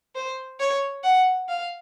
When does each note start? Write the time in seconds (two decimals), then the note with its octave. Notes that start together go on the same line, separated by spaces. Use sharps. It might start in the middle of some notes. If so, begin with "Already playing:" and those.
0.15 C5
0.60 C#5
1.04 F#5
1.49 F5